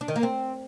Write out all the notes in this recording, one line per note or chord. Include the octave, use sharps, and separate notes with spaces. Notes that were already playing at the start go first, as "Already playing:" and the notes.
D4
D#3
A#3
C4